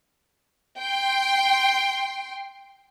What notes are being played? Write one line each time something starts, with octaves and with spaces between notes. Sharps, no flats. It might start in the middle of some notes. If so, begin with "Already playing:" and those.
G5 C6